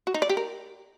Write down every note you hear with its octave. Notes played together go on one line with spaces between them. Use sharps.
F#4
D#4
D5
G4
A#4